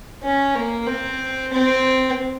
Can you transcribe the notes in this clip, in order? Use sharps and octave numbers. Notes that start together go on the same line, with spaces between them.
C#4
A#3
C4
C4